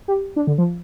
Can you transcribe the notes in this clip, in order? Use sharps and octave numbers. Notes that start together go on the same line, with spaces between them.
G4
D4
D3
F3